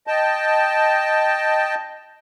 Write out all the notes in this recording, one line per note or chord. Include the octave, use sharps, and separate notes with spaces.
D#5 G5 A5